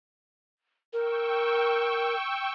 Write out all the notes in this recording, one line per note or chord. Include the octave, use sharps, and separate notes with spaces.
A#4 G5 C#6 E6